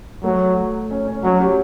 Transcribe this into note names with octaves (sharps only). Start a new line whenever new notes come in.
F#3 A3
C#4
C#4
F#3 C#4
G4